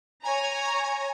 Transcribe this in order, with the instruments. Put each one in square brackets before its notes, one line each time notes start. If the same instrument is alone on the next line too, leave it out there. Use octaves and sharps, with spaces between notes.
[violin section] C#5 A#5 [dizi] G#5